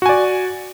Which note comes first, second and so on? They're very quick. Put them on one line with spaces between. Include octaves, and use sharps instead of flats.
F#4 G#5 D5